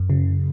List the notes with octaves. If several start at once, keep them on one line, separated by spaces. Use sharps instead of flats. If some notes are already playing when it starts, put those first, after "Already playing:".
Already playing: F#2
C#3